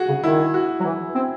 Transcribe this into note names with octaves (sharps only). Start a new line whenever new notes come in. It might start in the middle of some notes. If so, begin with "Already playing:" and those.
Already playing: F#4 G#4
C#3
D#3 E4
F#4
F#3
E3
C4